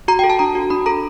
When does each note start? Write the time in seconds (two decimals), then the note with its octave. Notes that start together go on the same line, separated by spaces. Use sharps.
0.08 F#4 A#5
0.19 G5
0.24 A4
0.30 A5
0.39 D4 A#5
0.55 F#4
0.70 D4 B5
0.86 A4 A#5